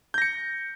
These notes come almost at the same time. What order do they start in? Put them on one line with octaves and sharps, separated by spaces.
G6 A#6 C#7